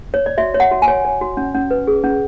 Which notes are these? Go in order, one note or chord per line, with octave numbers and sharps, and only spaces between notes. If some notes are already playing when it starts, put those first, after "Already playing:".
C#5
D5
F#4 E5
C#5
F#5
F#4
G#5
C#5
C#5
F#4
C#4
C#4
B4
G#4
C#4